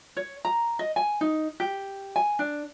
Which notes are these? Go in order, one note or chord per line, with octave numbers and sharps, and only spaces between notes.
C#5
A#5
D#5
G#5
D#4
G4
G#5
D4